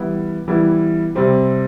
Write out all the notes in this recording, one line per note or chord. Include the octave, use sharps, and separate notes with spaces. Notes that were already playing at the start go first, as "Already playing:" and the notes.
Already playing: E3 G3 B3 E4
E3 G3 B3 E4
C3 G3 C4 G4